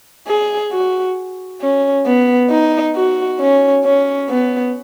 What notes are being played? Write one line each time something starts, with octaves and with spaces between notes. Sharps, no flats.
G#4
F#4
C#4
B3
D#4
F#4
C#4
C#4
B3